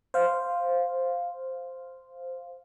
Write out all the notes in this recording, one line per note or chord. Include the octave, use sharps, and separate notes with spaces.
C5 F5